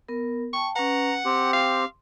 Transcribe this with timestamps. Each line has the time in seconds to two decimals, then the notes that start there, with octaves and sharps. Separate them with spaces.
0.09 B3 A#4
0.53 G5 A5 C#6
0.76 C#4 B4 F#5 A#5
1.25 C4 G4 C6
1.53 F5